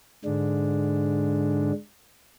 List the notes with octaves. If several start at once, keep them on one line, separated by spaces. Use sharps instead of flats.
G#2 D3 G#3 D4